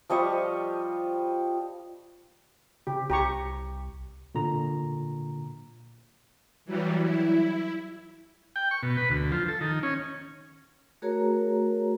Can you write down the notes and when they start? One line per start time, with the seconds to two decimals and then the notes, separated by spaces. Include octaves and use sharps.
0.10 F3 G3 D#5 C#6
2.87 C#3 G4
3.10 C2 G4 A#5 C#6
4.35 A#2 D3 A#5
6.65 E3 F#3 G3
7.04 E4
8.56 G5
8.71 C#6
8.83 B2
8.97 B4
9.10 D2
9.32 F3
9.48 A4
9.61 D#3
9.83 C#4
11.02 A3 F#4 G#4 A#4 C#5 A#5